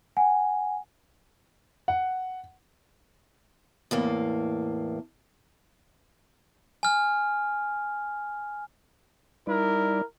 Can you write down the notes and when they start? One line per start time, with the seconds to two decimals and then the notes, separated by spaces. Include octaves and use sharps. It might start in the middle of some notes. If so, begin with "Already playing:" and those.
0.17 F#5 G#5
1.88 F#5
3.91 E2 A2 A#3
6.83 G#5 F6
9.47 G3 D#4 E4 A#4 D5